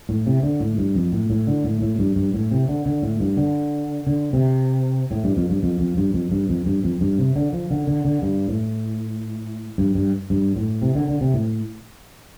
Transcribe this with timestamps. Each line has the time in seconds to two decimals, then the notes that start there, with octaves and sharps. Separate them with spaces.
0.09 A2
0.26 C3
0.43 D3
0.60 A2
0.78 G2
0.95 F2
1.12 A2
1.30 A2
1.47 D3
1.64 A2
1.82 A2
1.99 G2
2.16 G2
2.34 A2
2.51 C3
2.69 D3
2.86 D3
3.03 A2
3.20 G2
3.37 D3
4.07 D3
4.33 C3
5.11 A2
5.24 G2
5.37 F2
5.50 G2
5.63 F2
5.80 F2
5.97 G2
6.14 F2
6.32 G2
6.49 F2
6.66 G2
6.84 F2
7.01 G2
7.18 C3
7.36 D3
7.53 F3
7.71 D3
7.87 D3
8.05 D3
8.22 G2
8.48 A2
9.78 G2
9.95 G2
10.30 G2
10.56 A2
10.82 C3
10.95 D3
11.08 D3
11.21 C3
11.34 A2